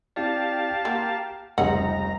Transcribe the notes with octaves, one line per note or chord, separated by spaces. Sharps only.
C4 E4 G4 D5 F5 A5
A#3 F#5 A#5
F1 C#2 G3 G#4 D#5 F#5 A#5